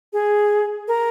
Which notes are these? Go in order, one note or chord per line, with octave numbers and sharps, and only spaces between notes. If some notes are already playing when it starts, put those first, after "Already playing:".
G#4
A#4